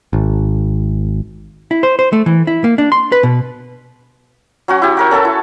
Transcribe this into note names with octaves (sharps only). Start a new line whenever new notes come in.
G#1
E4
C5
C5
A3
E3
E4
A#3
D4
C6
B4
B2
F#3 C#4 F#4
E4 G4
F#4 A#4 C#5
C#4 A4 E5 A5
E4